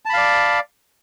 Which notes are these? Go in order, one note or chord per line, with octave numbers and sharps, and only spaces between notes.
D5 F5 A5 B5